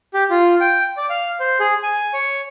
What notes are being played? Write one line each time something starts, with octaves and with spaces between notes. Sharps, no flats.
G4
F4
G5
D5
F5
C5
G#4
G#5
C#5